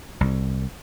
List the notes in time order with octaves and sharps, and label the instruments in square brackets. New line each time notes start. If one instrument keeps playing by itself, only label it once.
[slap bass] C2